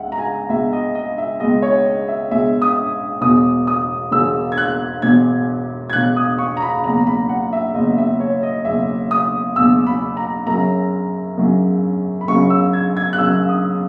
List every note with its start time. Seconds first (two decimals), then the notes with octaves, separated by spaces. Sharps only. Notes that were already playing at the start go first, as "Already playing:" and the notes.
Already playing: C#2 G#3 E5 F#5
0.12 A#5
0.19 G#5
0.49 C#2 B2 G#3 E5
0.73 D#5
0.95 D#5
1.18 E5
1.40 C#2 B2 G#3 D#5
1.62 C#5
1.86 D#5
2.08 E5
2.31 C#2 B2 G#3 E5
2.62 D#6
3.21 E1 E2 B2 D#6
3.67 D#6
4.12 E1 E2 B2 E6
4.52 G#6
4.58 F#6
5.02 E1 E2 B2 G#6
5.90 G#6
5.93 E1 E2 B2 F#6
6.16 D#6
6.38 C#6
6.57 A#5
6.62 B5
6.72 B5
6.84 F#1 E2 B2 A#5
7.07 B5
7.29 F#5
7.53 E5
7.74 F#1 E2 B2 D#5
7.98 E5
8.20 C#5
8.43 D#5
8.65 F#1 E2 B2 E5
9.11 D#6
9.56 F#1 E2 B2 E6
9.87 B5
10.17 A#5
10.47 F#2 C#3 F#3 A#5
11.37 F#2 C#3 F#3
12.21 B5
12.28 F#2 C#3 F#3 C#6
12.50 E6
12.73 G#6
12.97 G#6
13.13 F#6
13.18 F#2 C#3 F#3 E6
13.49 D#6